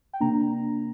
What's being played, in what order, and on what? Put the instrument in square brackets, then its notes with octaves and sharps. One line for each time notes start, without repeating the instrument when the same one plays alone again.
[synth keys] G5
C3 A#3 D4 A#5